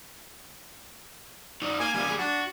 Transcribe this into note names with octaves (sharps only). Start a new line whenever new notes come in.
D#4 F#4 D5
A#3 G#5
D#3 G3 A#3 G#5
G3 G#4
D4 F#4